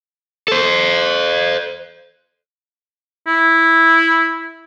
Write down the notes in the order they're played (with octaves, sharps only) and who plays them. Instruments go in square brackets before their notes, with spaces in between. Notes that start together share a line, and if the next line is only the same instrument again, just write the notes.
[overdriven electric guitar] A4 C5
[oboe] E4